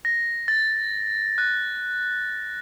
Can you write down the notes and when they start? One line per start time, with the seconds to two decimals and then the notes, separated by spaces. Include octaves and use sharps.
0.05 A#6
0.48 A6
1.38 F#6